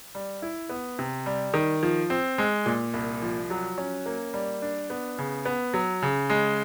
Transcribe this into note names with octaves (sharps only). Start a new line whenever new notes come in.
G3
E4
B3
C3
G3
D#3
F3
C4
G#3
A#2
C2
F3
F#3
C#4
A#3
G3
D4
B3
C#3
B3
F#3
C#3
G#3